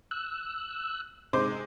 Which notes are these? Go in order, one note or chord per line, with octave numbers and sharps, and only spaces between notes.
E6 F#6
C3 G#3 D#4 C5 D6